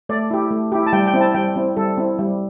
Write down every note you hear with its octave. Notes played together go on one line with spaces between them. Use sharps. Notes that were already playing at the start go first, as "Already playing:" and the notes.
A3 D5
E4 G4
A3
E4 G4
A5
G3 G5
G5
C4 E4
A5
G3 G5
C4 E4
G3 A4
C4 E4
G3